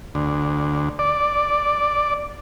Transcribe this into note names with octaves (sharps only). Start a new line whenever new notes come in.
D2
D5